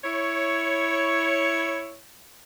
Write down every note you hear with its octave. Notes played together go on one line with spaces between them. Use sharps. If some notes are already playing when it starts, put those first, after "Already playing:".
E4 C#5